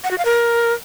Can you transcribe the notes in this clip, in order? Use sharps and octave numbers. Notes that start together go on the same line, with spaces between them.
F#5
F#4
F5
A#4